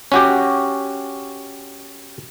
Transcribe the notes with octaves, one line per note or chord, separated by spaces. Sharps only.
C#4 F#4 G4